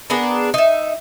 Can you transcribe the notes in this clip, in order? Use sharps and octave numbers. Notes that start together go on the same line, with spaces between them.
B3 D4 G#4 A#4
D#4 E5